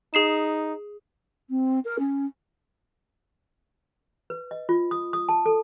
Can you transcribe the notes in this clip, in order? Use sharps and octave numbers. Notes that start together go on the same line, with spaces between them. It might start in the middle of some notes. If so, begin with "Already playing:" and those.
D#4 G#4 C7 E7
C4
A#4
C#4
B4
D#5
F4
D#6
D#6
A5
A4